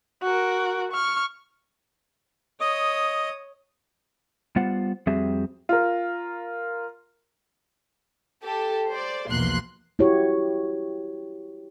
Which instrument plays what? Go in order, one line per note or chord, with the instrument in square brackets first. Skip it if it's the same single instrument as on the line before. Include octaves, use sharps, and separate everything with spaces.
[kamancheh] F#4 A#4
C#6 F6
[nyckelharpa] C#5 D#6 [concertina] D#5
[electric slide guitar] G3 B3 F4 C5 F#5
F2 G3 C4 F#4 G#4 E5
[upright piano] F4 A#4
[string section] G4 A4
C5 D5
B1 E2 F3 A#3 C6 F#6
[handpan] E4 F#4 G4 C#5